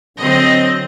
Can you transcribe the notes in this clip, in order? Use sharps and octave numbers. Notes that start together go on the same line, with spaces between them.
D3 F#3 C4 D#5